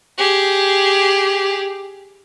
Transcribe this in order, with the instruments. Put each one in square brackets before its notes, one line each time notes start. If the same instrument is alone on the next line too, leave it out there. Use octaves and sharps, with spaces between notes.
[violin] G4 G#4